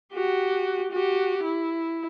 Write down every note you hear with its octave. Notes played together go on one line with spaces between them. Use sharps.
F#4 G4
F#4 G4
E4